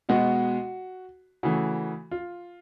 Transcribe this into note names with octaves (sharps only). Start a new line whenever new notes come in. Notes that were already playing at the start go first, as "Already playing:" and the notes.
B2 G#3 B3 F#4
C#3 E3 A3 F#4
F4